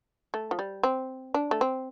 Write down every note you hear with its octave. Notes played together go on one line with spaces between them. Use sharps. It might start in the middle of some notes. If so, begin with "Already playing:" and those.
A3
F3
G3
C4
D4
A3
C4